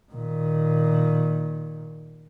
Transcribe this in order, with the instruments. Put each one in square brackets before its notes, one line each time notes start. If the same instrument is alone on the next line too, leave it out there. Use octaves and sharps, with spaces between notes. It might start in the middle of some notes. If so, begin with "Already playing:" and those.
[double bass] A#2 D#3